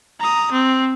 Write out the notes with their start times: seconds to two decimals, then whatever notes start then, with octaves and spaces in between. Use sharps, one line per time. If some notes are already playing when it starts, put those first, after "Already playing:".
0.20 A#5 D#6
0.52 C4